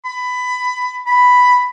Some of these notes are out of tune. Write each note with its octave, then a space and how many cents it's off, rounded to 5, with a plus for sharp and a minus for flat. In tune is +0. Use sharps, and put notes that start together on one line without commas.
B5 +20
B5 +5